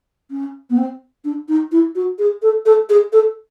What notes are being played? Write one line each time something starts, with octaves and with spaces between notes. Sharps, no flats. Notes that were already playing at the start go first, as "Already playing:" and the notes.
C#4
B3
C4
D4
D#4
E4
F#4
G#4
A4
A4
G#4
A4